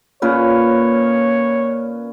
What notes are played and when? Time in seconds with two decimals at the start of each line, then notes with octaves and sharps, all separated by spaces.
0.22 A#2 C#4 B4 C#5